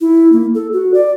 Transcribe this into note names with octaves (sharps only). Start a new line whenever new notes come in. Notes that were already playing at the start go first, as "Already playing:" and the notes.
E4
A#3
A4
F#4
D5